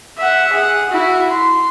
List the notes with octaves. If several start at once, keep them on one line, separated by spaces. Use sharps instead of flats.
E5 F#5
G#4 F#5
E4 F#4
C6